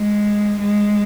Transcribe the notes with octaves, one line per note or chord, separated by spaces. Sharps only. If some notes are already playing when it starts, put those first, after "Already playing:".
Already playing: G#3
G#3